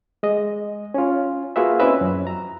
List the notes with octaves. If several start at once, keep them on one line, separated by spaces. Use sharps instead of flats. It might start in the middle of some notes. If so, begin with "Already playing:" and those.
G#3 D#5
C#4 F4
A#3 F4 F#4 G#4 B4 E5
C4 C#4 E4 B4 D#5 E5
F#2
A#5